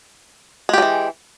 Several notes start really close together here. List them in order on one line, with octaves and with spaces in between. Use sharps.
G#3 G4 F#3 E3